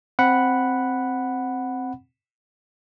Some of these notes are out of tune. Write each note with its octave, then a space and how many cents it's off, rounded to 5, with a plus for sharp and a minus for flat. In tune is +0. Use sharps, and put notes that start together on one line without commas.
C4 +0 F#5 +0 B5 +0